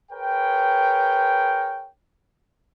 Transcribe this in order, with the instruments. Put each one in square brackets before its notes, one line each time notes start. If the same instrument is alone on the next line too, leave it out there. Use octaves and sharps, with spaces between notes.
[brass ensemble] G#4 A#4 B4 C#5 G5